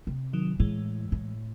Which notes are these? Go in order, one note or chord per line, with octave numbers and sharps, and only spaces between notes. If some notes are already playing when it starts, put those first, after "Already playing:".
C3
D#3 F#3
A2 E3 G#3
A2